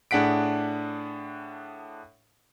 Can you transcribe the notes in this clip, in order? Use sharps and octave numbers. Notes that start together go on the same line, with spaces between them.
A2 D4 G#4 F#5 B6 D7